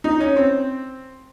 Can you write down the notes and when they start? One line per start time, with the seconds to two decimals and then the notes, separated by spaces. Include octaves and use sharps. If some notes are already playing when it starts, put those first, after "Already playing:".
0.04 D#4
0.20 C#4
0.36 C4